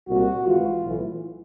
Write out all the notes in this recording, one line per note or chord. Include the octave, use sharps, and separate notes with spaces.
C2 A#2 F#4
G#1 G#2 E3 F4
B1 A2 E3